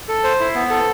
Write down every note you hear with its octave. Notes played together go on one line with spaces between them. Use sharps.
A4
C5
E4
B3
A4